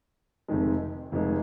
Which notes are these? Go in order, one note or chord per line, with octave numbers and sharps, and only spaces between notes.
F1 F2 D#3 G#3
F1 F2 D#3 G#3